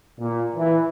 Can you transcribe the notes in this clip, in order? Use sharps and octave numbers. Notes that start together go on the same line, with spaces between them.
A#2
E3